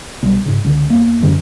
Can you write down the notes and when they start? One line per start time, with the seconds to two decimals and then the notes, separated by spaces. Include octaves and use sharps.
0.23 B1 G3
0.46 G#2 C#3
0.65 C#2 D3
0.90 E2 A#3
1.23 F#2 D3 E3